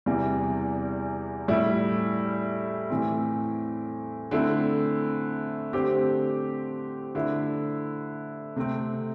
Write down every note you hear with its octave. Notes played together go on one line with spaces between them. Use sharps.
E2 C3 E3 G3
A2 G3 E4
A2 E3 C4
D3 A3 C4 E4
D3 A3 C4 G4 C5
D3 A3 E4
C3 A3 C4